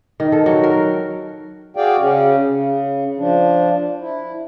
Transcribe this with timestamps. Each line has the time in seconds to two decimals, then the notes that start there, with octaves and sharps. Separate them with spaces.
0.20 D#3
0.32 A4
0.46 F#3
0.63 A#4
1.77 F#4 G#4 D5 F5 G5
2.00 C#3 C#4
2.46 C#3
3.18 F3 D4
4.00 E4